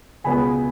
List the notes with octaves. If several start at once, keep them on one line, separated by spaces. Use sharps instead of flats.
C#2 B2 G#3 B3 G#5 B5